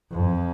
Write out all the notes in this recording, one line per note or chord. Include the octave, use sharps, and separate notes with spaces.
F2